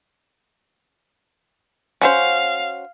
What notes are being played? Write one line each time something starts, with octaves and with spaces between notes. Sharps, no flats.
C#4 F#4 C5 F5